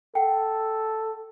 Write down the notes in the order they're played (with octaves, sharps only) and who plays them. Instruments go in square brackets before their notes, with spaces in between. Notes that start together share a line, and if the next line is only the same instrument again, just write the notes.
[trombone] A4 [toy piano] F#5 G5